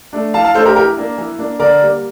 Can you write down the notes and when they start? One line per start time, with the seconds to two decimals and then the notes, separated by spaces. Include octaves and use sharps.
0.13 A3 D4
0.34 E3 F5 A5
0.44 F5 A5
0.54 A3 D4 A4 C5
0.65 G4 A#4
0.76 E3 G4 A#4
0.97 A#3 D4
1.18 E3
1.38 A#3 D4
1.59 D3 A#4 D5
1.81 G3 A#3